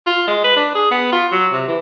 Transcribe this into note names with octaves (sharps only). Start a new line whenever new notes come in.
F4
G#3
B4
D4
G#4
B3
F4
F#3
C3
E3